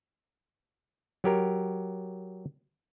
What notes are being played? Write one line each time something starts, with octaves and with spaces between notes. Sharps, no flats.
F#3 G4 A#4